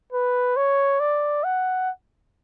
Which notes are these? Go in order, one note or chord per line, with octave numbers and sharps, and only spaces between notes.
B4
C#5
D5
F#5